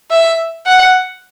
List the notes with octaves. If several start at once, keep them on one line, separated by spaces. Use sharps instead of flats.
E5
F#5